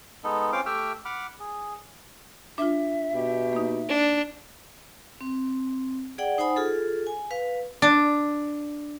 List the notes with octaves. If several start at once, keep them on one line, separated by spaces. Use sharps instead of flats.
G#3 B3 D#4 A4
C4 C#4 F4 F5 G5 D6
A3 G4 E5 G5 E6 F6
F#5 B5 D6 F6
G#4
D4 F4 E5
B2 G4
A#3 D#4
D4
C4
G#4 D5 F#5 G5
D#4 C5 F#5 G#5 B5 D#6
F4 G#4 A4
G#5
B4 F5
D4